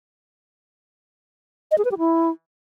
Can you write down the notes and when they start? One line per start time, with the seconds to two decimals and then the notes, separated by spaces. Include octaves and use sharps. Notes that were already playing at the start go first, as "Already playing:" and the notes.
1.71 D#5
1.78 G#4
1.85 B4
1.91 G4
1.98 E4